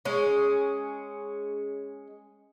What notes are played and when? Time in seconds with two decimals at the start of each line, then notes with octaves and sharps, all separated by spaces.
0.05 G#3 C#4